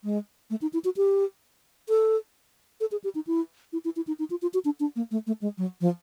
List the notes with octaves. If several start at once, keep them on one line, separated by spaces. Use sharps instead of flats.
G#3
A3
D#4
E4
F#4
G4
A4
A4
G#4
G4
D#4
E4
E4
E4
E4
D#4
D#4
F4
F4
F#4
D4
D4
A#3
A3
A3
G#3
F#3
F3